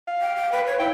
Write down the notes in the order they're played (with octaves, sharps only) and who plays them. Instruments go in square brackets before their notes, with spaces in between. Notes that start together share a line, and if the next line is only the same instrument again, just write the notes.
[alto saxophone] F5
[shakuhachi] G5
G5
B4
C#5
[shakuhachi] E4 [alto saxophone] G5